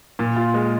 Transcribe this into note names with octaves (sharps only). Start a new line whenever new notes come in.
A#2
F4
G#3